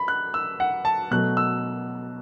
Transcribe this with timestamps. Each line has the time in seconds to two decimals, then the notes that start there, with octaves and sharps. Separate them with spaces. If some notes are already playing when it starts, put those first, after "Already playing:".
Already playing: B5
0.08 F#6
0.34 E6
0.60 F#5
0.85 A5
1.11 B2 F#3 A3 F#6
1.37 E6